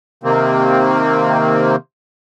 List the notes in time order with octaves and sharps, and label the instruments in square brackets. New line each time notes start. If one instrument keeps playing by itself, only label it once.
[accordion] C3 D#3 A#3 C4